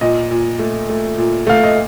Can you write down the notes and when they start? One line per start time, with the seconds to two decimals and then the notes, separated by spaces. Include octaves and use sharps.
0.01 A#2 D#5
0.31 A#2
0.59 A3
0.89 A3
1.18 A#2
1.47 A3 F5
1.63 D#5